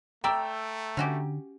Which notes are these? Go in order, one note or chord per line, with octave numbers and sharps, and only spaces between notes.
A3 D5 E5 G5 A#5 E6
D3 C#4 F#4 G4